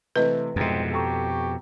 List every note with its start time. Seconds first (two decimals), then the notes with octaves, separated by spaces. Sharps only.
0.16 C3 E3 A3 B4 D#5
0.56 C2 F2 G#2 B2 G#3 C4
0.92 G4 A4 A#5 C#6